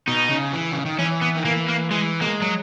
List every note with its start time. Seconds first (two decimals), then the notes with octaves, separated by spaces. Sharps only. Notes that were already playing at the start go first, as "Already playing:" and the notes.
0.08 B2 D#4
0.30 C#3
0.53 E3
0.71 C#3
0.85 D#3
0.99 E3 C#4
1.22 B3
1.35 D#3
1.45 E3 A#3
1.69 A#3
1.91 E3 G#3
2.21 G#3 A#3
2.42 F#3